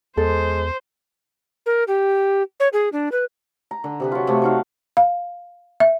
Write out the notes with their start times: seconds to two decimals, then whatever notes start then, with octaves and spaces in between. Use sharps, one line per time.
0.17 E2 G#3 A4 C5
1.66 A#4
1.88 G4
2.60 C#5
2.73 G#4
2.93 D4
3.12 B4
3.71 A#5
3.84 D3
4.00 C3 G#4 B4
4.12 F#3 F4
4.27 C3 A3
4.42 F#3 D#4 F5
4.97 F5
5.80 E5